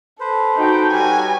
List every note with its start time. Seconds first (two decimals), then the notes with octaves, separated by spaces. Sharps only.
0.20 A4 B4 C5
0.56 D#4 F#4 G5
0.92 G3 D#4 F#4 B4 C#5 G#5